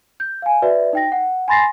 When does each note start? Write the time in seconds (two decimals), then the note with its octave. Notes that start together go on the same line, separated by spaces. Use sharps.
0.20 G6
0.42 F5 G#5
0.62 F#4 B4 D5 E5
0.93 D#4 G5 A#6
1.12 F#5
1.48 G#5 B5 C6 A6 A#6 C7